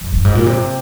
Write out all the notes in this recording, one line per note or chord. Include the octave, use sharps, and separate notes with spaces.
F2
G2
G#2
A#2
C3